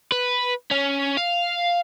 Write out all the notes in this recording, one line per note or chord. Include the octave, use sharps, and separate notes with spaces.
B4
C#4
F5